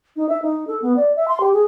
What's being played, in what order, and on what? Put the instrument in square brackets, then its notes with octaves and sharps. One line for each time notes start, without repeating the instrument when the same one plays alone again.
[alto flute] D#4
E5
D#4
A4
B3
D5
E5
C6
G4
G#4